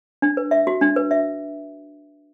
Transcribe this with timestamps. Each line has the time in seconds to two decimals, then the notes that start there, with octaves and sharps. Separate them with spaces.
0.22 D4
0.37 B4
0.51 E5
0.67 F#4
0.81 D4
0.96 B4
1.11 E5